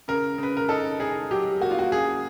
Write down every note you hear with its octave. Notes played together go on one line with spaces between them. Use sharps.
C#3 A#4
C#3 B4
A#4
D#4 A4
D#4 G#4
F#3 G4
A#3 F#4
F4
F#4
C#3 G#4